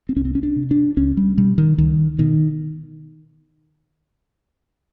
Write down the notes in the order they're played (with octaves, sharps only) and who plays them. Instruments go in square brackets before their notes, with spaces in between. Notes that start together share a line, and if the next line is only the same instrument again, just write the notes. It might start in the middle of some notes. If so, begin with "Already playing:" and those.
[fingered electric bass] C4
C2 C#4
C4
C#4
D4
C3
D4
C#2 C#4
G3
B2 G3
D#3
C#2 D#3
B2 D#3